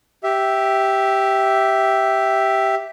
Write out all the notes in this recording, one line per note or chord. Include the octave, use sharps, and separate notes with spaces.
G4 E5